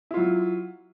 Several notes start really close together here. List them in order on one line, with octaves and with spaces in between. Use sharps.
E4 F4 F#3